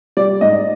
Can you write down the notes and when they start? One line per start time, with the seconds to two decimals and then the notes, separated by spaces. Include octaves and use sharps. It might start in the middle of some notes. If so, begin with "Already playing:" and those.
0.17 G3 D5
0.41 G#2 D#5